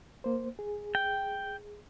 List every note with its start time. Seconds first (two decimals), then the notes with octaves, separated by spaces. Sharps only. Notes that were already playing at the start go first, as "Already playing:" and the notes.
0.24 A#3 C5
0.59 G#4
0.95 G5